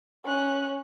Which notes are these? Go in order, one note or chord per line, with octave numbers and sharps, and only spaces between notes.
C#4 F#6